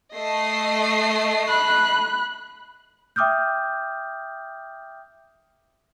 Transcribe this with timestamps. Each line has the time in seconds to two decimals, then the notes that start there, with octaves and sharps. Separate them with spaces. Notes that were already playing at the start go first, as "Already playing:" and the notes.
0.15 A3 D#5 C7
1.49 B5 F#6
3.16 E5 G5 D6 D#6 F6 G6